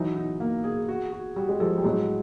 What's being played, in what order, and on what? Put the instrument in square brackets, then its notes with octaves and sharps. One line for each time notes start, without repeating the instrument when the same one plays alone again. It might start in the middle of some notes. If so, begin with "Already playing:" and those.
Already playing: [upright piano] E3 F#3 [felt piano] D#4
[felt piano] D#4
A#3
G#4
F#4
F#4
[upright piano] G3 [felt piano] F#4
[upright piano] G#3
[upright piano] F3 G3 [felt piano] A4
[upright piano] G3
[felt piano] A2 [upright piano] F#3 G#3